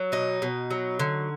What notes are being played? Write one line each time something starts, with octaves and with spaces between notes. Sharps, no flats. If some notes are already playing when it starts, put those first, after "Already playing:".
Already playing: F#3
B2 D#4
B2
F#3
D3